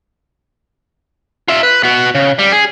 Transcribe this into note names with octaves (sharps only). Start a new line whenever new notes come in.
F4 E5
B4
B3 F#4
C#3
G3
G#4